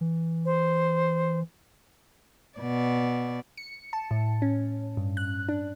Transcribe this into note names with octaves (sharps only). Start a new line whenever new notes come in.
E3
C5
B2 D5
C#7
A5
A2
C#4
G2
F#6
D4